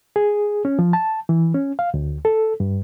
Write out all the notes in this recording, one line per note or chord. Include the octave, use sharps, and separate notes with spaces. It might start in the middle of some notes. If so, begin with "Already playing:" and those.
G#4
C#4
F3
A5
E3
C#4
F5
D2
A4
G2